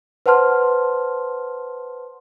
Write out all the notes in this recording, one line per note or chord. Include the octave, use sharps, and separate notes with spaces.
B4 C5 F#5 A5 C6 F6